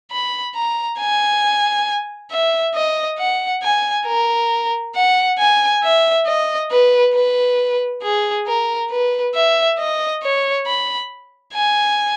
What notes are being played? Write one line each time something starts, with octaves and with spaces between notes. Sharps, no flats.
B5
A#5
G#5
E5
D#5
F#5
G#5
A#4
F#5
G#5
E5
D#5
B4
B4
G#4
A#4
B4
E5
D#5
C#5
B5
G#5